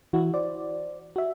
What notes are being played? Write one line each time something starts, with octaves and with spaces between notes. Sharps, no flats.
E3 E4 F#4
C5 D5
F#4 E5